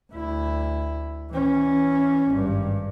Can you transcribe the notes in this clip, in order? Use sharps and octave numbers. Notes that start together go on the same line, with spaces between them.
D2 E4
E3 C#4
G#1 G2